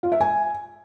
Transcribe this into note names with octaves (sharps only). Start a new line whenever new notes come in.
F4
E5
G#5